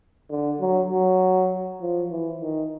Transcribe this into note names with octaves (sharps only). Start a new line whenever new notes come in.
D3
F#3
F#3
F3
E3
D#3